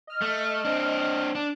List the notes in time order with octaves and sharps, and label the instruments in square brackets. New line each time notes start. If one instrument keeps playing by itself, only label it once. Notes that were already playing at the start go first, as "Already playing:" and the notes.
[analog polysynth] D#5 F6
[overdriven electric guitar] A3
C4 D4
D4